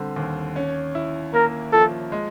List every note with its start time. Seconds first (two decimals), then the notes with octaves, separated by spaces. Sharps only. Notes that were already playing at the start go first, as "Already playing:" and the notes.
Already playing: D3 G3 C4
0.16 D#2
0.56 C#4
0.95 E4
1.34 A#3 A#4
1.72 F3 A4
2.12 G#3